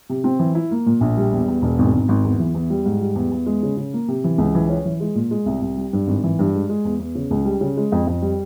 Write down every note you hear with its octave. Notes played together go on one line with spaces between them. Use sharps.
C3
C4
E3
E4
A#3
A#2
A#1
G3
E2
E2
E1
G#1
G#1
G#1
E2
E3
E2
G3
G#2
G3
E2
E2
G#3
C#3
C#3
A#3
C3
E3
C#2
E3
C#4
E3
G#3
A#2
G#3
C2
C2
G3
G2
G#1
E3
G2
G#3
G#3
E2
E2
C#3
C#2
G3
C#3
G#3
F2
F2
G3